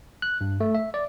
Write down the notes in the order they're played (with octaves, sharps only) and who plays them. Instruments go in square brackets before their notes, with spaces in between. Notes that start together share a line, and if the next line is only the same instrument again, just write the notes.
[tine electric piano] F#6
G2
A3
E5
D5